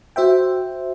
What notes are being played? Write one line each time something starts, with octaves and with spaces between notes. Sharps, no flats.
F#4 C5 E5 G5